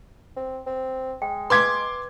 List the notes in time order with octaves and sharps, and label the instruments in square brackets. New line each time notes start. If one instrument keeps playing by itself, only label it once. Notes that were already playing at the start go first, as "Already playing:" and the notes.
[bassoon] C4
C4
[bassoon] G#3 [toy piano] G5
[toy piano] B4 D#5 F5 [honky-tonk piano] C6 D6 G#6